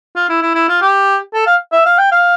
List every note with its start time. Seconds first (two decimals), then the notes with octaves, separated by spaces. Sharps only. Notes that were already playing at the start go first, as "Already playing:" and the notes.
0.16 F4
0.29 E4
0.42 E4
0.55 E4
0.68 F4
0.81 G4
1.34 A4
1.47 F5
1.72 E5
1.85 F5
1.98 G5
2.12 F5